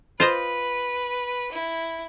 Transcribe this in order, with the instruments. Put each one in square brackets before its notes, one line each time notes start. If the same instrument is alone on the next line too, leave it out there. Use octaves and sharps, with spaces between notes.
[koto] F4 C5 D#5 [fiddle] B4
[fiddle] E4